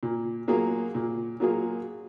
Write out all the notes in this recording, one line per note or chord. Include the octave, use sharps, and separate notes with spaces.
A#2
F#3 A#3 F4 G#4
A#2
F#3 A#3 F4 G#4